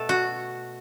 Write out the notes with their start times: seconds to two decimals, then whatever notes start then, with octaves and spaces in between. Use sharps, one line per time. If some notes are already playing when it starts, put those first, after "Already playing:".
Already playing: B2 A3 A4
0.09 F#4